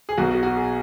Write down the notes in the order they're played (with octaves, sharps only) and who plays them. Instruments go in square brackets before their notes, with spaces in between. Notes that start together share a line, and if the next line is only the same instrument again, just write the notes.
[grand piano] G#4
B1 B2 F#4
F#4
F#4
G#4